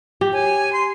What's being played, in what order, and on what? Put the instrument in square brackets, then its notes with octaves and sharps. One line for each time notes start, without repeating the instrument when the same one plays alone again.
[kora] G4
[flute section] C#5 G#5
C6